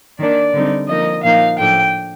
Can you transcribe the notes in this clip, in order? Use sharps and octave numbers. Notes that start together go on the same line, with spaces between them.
D#3 A#3 D4 D5
D3 G3 C4 D#4
F3 A#3 D#4 D#5
A#2 F3 A#3 D#4 F5
A2 F3 A3 D4 G5